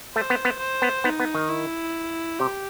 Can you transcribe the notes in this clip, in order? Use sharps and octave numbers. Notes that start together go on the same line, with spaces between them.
A3 C5
B3
B3
C5
B3
B3 D#4
B3
D#3
E4
C3 G4